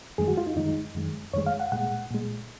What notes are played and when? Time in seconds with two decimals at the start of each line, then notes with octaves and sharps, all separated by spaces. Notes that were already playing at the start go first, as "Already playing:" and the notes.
0.18 F#2 D#3 G#3 G#4
0.28 F#4
0.37 F4
0.47 D#4
0.57 F#2 D#3 G#3 D#4
0.95 F#2 D#3 G#3
1.34 F#2 D#3 G#3 C#5
1.46 F5
1.60 F#5
1.72 A#2 G#3 F#5
2.11 A#2 G#3